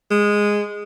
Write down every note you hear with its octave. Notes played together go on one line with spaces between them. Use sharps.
G#3